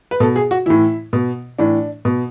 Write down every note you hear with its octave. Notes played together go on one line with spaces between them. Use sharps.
B4
B2 A4
G#4
F#4
A2 E3 E4
B2
A2 E3 D4
B2